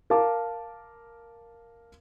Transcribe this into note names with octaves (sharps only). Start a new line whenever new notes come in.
A#4 F5 A5 D6